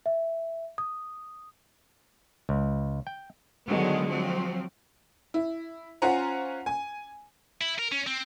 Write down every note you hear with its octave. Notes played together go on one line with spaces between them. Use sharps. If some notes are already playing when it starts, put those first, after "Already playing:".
E5
D#6
C#2
G5
D3 D#3 F#3 G#3 B3
F3 F#3 C4
E4
C#4 F4 C5 F#5 G#5 A#5
G#5
E4
A#4
C#4
C4